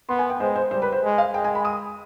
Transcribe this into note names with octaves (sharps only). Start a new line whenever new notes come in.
B3 C6
G#5
G5
G#3 C5
C5
G3 C5
B4
C5
G#3
F5
G#3 G5
G#5
B5
D#6